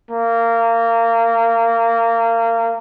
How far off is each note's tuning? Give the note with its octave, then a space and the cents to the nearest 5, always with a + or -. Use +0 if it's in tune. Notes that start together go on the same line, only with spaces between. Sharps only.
A#3 -25